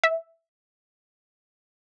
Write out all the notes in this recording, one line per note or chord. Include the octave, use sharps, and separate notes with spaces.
E5